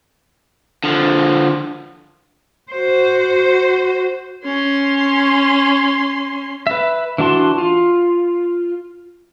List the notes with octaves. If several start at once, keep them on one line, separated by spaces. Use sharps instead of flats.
D3 F3
F#4 C5
C#4 C6
B4 E5
E3 D4 F#4 A5 C6
F4